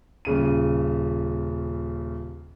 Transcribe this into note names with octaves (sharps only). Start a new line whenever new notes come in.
D#1 C#3 D#7